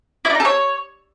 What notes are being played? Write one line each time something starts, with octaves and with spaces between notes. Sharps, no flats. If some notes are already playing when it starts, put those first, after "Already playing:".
E4
D4
D#4
A4
C#5